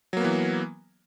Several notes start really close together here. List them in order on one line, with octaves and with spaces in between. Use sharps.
F#3 A#3 B3 E3